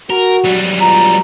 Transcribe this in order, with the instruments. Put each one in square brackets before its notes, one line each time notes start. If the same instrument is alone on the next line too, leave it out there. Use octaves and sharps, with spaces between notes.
[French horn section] F#4 [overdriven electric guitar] A#4
[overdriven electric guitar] F#3 G3
[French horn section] B3 D4 F4 [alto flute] A#5